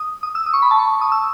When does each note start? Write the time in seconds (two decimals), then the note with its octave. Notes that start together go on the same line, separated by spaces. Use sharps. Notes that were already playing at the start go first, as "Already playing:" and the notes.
Already playing: D#6
0.23 D#6
0.35 E6
0.46 D#6
0.53 C#6
0.62 B5
0.71 A5
0.79 C#6
1.01 D#6
1.12 E6